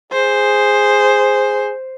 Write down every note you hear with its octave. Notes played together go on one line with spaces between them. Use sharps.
G#4 C5